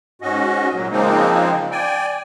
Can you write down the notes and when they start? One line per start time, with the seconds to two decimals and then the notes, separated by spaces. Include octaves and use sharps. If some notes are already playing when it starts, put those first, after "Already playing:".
0.22 G#2 C#4 F#4 D#5
0.73 A#2 F#3
0.91 C#3 F3 G#3 A#3 C4 D#4
1.71 D5 G5 G#5